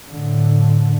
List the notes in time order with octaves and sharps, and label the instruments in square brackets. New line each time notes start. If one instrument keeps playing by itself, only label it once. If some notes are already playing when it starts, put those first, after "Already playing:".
[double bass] A2 D3